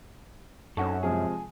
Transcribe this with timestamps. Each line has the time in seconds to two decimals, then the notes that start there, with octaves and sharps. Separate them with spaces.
0.77 F#2 C4 C#4 D#4 A4 F#5 C#6
1.03 C3 F3 G#3 G#4